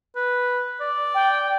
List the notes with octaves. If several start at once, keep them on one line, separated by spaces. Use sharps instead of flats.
B4
D5
G5